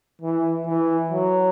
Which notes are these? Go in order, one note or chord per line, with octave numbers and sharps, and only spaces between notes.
E3
E3
F#3